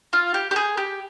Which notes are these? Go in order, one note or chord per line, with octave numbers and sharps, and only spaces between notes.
F4
G4
G4
G#4
G4